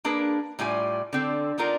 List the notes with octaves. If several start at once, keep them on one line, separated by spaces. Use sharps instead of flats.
A#3 D4 G#4 A#4 B4
A2 G3 F4 G#5
D3 C4 A4
B3 D4 D#4 F4 A#4